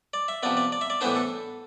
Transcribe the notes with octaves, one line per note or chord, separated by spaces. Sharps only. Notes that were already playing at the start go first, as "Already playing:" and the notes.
D5
E5
C3 F3 B3 D5
D5
D5
E5
D5
A2 E3 B3 D4 C5
A4